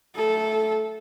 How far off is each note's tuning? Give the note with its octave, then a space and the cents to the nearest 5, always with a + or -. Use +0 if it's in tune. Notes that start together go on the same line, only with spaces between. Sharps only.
A3 +0 A4 -15